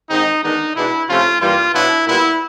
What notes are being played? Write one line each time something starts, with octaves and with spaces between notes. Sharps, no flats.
G#2 D#3 G#3 C4 D#4
D#3 G#3 B3 D4 D#4
B2 G#3 B3 D4 E4
C3 F3 A3 C#4 F4
G2 E3 G3 A#3 F4
B2 F#3 B3 D4 E4
A#2 G3 B3 E4